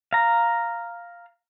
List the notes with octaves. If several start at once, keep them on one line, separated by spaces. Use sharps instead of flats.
F5 A#5